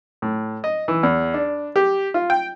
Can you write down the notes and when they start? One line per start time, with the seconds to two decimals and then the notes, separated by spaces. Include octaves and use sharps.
0.22 A2
0.64 D#5
0.88 E3
1.03 E2
1.34 D4
1.76 G4
2.14 F4
2.30 G5